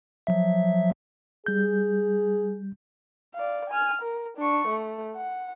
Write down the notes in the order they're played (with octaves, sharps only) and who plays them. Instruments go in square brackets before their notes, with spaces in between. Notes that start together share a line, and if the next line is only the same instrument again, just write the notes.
[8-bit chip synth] F3 F#3 E5
[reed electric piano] G3 G6 [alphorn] G#4
[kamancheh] D5 F5
G#5 F6
A#4
D4 C#6
A3
F#5